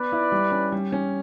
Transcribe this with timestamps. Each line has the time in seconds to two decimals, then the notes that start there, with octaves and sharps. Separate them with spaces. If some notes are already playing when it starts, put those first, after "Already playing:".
Already playing: B3 B4 D5
0.12 E4
0.32 G3
0.52 C#4
0.72 G3
0.92 C#4